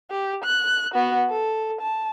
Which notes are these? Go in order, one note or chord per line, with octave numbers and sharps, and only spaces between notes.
G4
F#6
B3 F#4
A4
A5